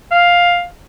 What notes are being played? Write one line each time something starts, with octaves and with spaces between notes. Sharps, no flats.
F5